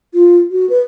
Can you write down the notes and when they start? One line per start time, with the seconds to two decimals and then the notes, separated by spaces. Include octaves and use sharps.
0.14 F4
0.51 F#4
0.69 B4